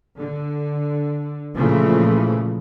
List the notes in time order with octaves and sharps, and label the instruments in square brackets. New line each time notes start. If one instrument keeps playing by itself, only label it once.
[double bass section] D3
A#2 C#3 E3 F3 A3